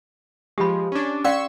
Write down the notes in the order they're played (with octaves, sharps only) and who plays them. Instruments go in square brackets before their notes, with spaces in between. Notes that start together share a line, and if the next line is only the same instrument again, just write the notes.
[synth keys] F3 G#3 [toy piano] G4 B5
[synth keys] C#4 D4
[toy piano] C#4 D5 F5 [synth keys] C6 C#6 E6